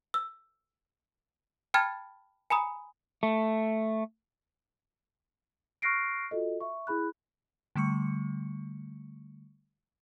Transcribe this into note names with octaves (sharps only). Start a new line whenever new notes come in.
E6
G5 A5 B5 F6 G#6 A6
G#5 A#5 B5 D#6
A3
C#6 F6 F#6 A#6 C7 D7
F4 F#4 A4 D#5
E5 C#6
E4 G#4 B5 F#6
D3 G3 A3 C#6 C#7